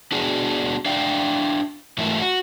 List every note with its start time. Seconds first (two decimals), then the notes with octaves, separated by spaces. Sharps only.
0.12 B3 D4 F#4 G#4
0.86 D4 D5 E5 F5 G5
1.98 G#2 E3 F#3 A3 A#4 E5
2.20 F#4